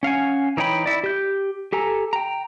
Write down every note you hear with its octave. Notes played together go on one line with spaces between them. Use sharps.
C#4 F5 F#5 G#5
E3 D#4 C#5 G5 B5
E4 D5
G4 G6
G4 A4 G#5 A#5
G5 A#5